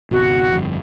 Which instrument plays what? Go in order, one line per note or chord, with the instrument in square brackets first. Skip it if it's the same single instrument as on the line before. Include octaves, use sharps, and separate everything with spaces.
[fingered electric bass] G#1 C#2 B2 [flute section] F#4
[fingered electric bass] G1 F2